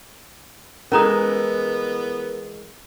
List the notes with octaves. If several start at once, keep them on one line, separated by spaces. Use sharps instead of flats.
E3 G#3 A3 B3 C#4 A#4 A#5 D#6